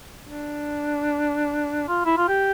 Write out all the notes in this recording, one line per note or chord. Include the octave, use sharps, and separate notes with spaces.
D4
F4
E4
F4
G4